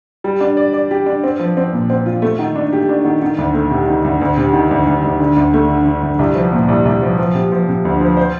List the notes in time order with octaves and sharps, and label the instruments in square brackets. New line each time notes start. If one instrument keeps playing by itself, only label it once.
[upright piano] G3
D4
D5
D5
G4
D4
C4
F3
C4
A#2
C4
F4
A3
D#3
D4
G4
D4
D#3
D#3
D2
A3
C3
D#3
D2
D2
C3
D#3
D2
D2
D2
D3
D2
A3
D3
D3
D2
C2
F3
A#2
C2
C2
F3
F3
C3
F3
C3
D2
F3
C5